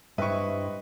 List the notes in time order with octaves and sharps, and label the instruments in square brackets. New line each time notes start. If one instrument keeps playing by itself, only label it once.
[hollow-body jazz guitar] G2 E4 [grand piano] B4 C#6 [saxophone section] C5 D#5 [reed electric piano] E5